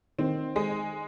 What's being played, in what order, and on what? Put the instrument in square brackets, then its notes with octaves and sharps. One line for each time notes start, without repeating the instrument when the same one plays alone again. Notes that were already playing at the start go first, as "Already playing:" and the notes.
[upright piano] D#3 [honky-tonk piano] C4
[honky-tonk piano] G#3